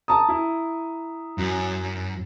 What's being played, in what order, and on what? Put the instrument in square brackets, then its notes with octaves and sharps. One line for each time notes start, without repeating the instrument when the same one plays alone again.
[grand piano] A5 D#6 [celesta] A#5
[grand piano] E4
[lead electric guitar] F#2